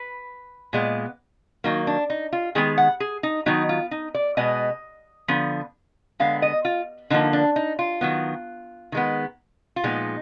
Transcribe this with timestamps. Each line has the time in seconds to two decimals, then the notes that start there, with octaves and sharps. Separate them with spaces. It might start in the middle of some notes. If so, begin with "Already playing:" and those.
Already playing: B4
0.73 A#2 G#3 B3
1.64 D#3 F#3 A#3 D#4
1.87 D4
2.10 D#4
2.33 F4
2.55 D#3 G#3 B3 G#4
2.78 F#5
3.00 G#4
3.23 D#4
3.46 D#3 F#3 B3 D#4
3.69 F4
3.91 D#4
4.14 D5
4.37 B2 G#3 B3 D#5
5.28 D3 F3 B3
6.19 D3 G#3 B3 F5
6.42 D#5
6.65 F4
7.10 D3 F3 A#3 D#4
7.33 D4
7.56 D#4
7.79 F4
8.01 D#3 F#3 B3
8.92 D#3 G#3 B3
9.76 F4
9.84 A#2 F3 G#3 B3 D#4